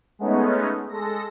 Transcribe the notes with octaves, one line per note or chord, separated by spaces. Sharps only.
G#3 A3 B3 C#4 D#4
G#3 A4 A#6